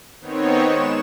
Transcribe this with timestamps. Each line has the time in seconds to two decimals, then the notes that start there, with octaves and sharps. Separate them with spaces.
0.20 D#3 B3 C4 D#4 C#5
0.67 G#3 E7